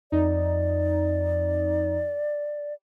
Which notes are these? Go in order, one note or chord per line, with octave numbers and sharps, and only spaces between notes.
F2 D#4 D5